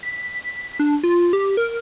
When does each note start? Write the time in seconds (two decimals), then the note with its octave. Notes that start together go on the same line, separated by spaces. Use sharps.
0.03 B6
0.79 D4
1.03 F4
1.33 G4
1.57 A#4